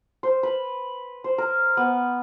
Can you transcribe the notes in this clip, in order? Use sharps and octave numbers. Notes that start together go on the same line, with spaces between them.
C5
B4
C5
A#4
B3